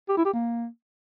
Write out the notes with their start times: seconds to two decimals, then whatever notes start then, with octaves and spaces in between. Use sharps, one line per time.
0.09 G4
0.17 E4
0.25 G4
0.33 A#3